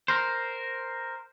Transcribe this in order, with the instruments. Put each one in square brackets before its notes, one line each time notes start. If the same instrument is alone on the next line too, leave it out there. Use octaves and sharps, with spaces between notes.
[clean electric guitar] A#4 C5